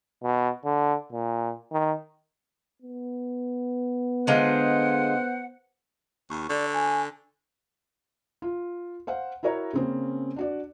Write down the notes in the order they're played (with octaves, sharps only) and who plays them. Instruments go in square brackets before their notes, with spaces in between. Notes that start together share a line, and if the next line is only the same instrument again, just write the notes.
[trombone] B2
D3
A#2
D#3
[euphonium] B3
[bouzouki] D3 G#3 F4 [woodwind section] C5 F#5
[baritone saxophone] D#2 [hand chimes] C#6
[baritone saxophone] D3 [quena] D5 [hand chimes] C#6
[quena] G#5
[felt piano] F4
C5 F5 F#5
E4 F#4 A#4 C#5 A#5
C#3 A#3 C4 C#4
D4 F#4 D5